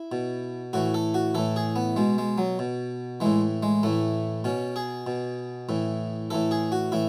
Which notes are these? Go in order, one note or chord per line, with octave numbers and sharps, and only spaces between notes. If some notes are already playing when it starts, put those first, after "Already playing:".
Already playing: E4
B2
A2 E3 F#4
A4
F#4
A2 E3 A4
G#4
B3
B2 G#3
G#3
F#3
B2
A2 E3 G#3
G#3
A2 E3 A3
B2 C#4
G#4
B2
A2 E3
A2 E3 A4
G#4
F#4
A2 E3 E4